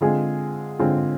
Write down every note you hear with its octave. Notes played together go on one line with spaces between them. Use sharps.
D3 G#3 C4 F4 G#4
D3 G#3 C4 F4 G#4